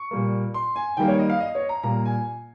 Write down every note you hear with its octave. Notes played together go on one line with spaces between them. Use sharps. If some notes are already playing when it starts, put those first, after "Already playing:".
Already playing: C#6
A#2 G3 A#3
C6
G#5
D#3 G3 A#3 G5
C#5
D#5
F5
D#5
C#5
A#5
A#2 G3 A#3 A#5
G#5